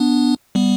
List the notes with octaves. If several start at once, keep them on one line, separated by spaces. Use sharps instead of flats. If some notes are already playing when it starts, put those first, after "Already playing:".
Already playing: B3 D4
G3 B3